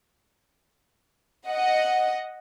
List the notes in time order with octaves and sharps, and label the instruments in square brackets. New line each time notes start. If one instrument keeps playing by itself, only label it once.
[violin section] D#5 F#5